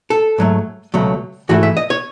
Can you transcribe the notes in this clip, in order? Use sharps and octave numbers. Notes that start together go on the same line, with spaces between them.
A4
G#2 F#3 A3
C#2 B2 F#3 A3
G#2 E3 A3 F#4
E5
D#5
C#5